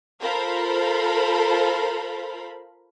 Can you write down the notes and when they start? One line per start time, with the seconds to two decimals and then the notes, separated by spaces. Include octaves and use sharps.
0.21 F4 A4 A#4 C5 F5 B5